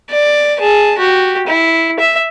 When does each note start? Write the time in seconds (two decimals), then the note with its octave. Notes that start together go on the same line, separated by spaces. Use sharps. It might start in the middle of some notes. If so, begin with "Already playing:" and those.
0.10 D5
0.60 G#4 A5
0.98 F#4 G4
1.47 E4
1.99 E5